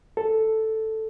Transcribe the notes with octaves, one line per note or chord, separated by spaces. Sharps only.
A4